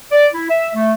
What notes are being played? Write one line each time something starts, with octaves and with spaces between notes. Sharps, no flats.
D5
E4
E5
A3